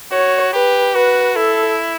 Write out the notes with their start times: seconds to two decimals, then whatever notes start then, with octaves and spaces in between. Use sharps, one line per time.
0.11 F#4 C#5
0.53 G4 B4
0.95 F#4 B4
1.36 E4 A4